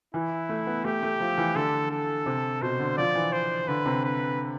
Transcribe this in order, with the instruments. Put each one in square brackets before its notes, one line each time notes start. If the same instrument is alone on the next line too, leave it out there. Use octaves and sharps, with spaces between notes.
[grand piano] E3 [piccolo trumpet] E4
[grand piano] A3
B3
[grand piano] A3 [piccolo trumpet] G4
[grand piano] A3
F3
E3
[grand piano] D3 [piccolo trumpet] A4
[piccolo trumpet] A4
[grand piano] C3
[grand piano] B2 [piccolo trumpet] C5
[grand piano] D3
[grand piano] F3 [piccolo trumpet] D5
[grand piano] E3
[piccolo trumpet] C5
[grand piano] D3 [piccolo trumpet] B4
[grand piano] C3
[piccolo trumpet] B4